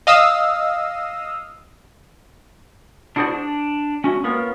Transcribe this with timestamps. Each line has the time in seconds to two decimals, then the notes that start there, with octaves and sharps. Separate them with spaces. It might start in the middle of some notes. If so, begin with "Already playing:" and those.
0.07 D#5 F5 D#6 E6
3.16 D4 E4 F#4 G#4 C5 D5
3.31 D4
4.04 C#4 F#4 E5
4.24 A#3 B3 C#4 F4 A#4